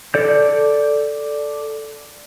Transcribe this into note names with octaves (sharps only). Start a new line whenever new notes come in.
A4 D5 G6